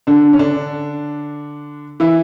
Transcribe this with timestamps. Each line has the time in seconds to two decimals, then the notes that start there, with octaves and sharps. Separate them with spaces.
0.07 D3 D4
0.33 C#4
0.39 D3 D4
2.00 E3 E4